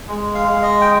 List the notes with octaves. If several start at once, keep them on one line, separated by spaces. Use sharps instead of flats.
G#3
F5
G#3
D#5
G5